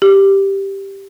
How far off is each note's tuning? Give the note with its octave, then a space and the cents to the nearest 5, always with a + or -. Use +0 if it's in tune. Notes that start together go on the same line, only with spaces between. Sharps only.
G4 +0